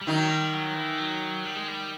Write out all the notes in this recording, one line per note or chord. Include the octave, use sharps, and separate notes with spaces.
G3
D#3 F#3 D#4
G3
F#3
E3
F#3
G3
G#3
G3